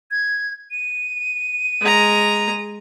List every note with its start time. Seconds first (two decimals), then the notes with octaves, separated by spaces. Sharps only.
0.11 G#6
0.71 D#7
1.81 G#3 A#5